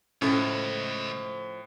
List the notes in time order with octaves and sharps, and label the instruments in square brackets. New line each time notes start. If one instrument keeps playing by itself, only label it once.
[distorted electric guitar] C#2 [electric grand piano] A2 [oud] F3 A3 C4 [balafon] C#4